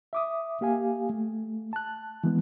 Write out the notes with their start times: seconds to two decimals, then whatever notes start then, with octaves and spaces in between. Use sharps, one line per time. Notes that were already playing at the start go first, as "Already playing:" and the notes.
0.13 E5 D6 D#6
0.61 A#3 G4 F5 G#5
1.09 A3
1.73 A5 F#6
2.24 E3 G#3 B3